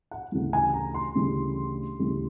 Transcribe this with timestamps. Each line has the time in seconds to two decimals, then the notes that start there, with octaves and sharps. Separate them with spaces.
0.11 F#5
0.32 D2 C#3 E3 G3
0.53 G#5
0.74 A#5
0.95 C6
1.15 D2 C#3 E3 G3
1.99 D2 C#3 E3 G3